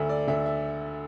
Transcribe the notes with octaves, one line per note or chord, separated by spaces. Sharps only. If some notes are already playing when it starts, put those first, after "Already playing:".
Already playing: D2 D3 A3 E5
D5
D2 D3 A3 E5
E5